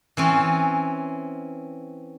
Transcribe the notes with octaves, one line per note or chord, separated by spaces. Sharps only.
E3 C4 C#4